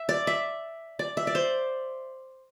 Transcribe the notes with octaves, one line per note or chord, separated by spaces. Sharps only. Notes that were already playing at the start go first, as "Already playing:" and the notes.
Already playing: E5
D5
E5
D5
E5
D5
C5